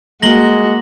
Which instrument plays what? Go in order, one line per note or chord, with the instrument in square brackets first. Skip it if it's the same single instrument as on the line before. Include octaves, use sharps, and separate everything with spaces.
[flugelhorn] G#3 [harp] A#3 [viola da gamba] F#4 [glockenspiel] A#6 F#7 G7